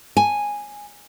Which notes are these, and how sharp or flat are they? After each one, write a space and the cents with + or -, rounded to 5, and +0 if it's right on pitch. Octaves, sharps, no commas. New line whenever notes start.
G#5 -5